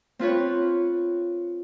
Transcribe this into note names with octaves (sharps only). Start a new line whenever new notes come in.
C4 F4 B4 C#5